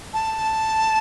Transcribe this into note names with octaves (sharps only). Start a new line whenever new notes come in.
A5